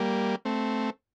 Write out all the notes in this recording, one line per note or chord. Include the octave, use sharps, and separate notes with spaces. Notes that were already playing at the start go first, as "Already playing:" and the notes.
Already playing: G3 A#3
A3 C4